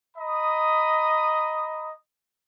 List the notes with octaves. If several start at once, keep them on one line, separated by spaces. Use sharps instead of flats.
D#5 A#5 B5 D#6